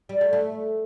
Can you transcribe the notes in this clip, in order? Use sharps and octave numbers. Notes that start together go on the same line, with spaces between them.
G3
A3
A3